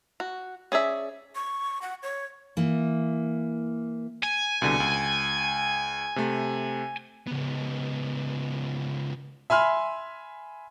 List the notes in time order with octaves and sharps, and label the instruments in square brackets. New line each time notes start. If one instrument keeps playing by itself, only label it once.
[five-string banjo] F#4
C#4 G#4 D5 E5
[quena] C#6
F#5
C#5
[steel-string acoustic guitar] E3 A#3
[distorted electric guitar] G#5
[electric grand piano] C2 B2 D3
C#2
C3 A3
[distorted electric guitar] C#2 B3
[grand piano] E5 G#5 B5 C6 F6